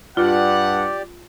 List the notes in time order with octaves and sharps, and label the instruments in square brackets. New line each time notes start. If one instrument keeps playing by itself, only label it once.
[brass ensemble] G2 F#5 [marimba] F4 [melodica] G4 D5